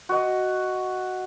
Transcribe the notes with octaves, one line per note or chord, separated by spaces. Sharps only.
F#4 D#5